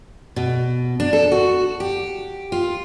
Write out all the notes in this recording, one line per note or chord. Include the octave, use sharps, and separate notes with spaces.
B2
D4
A4
F#4
G4
F4